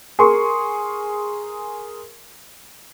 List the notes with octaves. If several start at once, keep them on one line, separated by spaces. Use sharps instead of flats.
G#4 A#4 C6 C#6